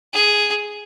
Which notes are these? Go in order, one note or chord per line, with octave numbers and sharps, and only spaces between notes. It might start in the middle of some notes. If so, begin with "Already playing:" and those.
G#4